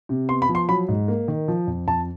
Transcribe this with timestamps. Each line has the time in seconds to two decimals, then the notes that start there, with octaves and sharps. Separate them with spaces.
0.09 C3
0.29 B3 C6
0.42 B5
0.49 F3
0.55 C6
0.69 F#3 B5
0.88 G#2
1.08 A#3
1.28 D#3
1.48 F3
1.67 F2
1.87 F2 A5